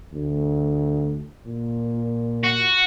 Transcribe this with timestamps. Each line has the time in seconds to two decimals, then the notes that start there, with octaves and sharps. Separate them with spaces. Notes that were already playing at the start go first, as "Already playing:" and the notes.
0.13 D2
1.46 A#2
2.44 F#4